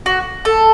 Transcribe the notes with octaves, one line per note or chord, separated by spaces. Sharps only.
F#4
A4